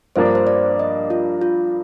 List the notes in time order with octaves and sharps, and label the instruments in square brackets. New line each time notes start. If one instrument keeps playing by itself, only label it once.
[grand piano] G2 F3 A#3 D4 [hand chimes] C5
[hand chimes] D5
C5
D5
D#5
F4
F4